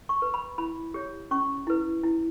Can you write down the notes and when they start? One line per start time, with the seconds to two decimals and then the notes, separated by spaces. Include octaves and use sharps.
0.09 C#6
0.22 B4
0.34 B5
0.58 E4 B5
0.94 G4 C#5
1.31 C#4 C#6
1.67 E4 B4
2.04 E4